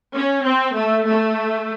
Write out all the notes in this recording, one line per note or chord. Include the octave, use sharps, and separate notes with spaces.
C#4
C4
A3
A3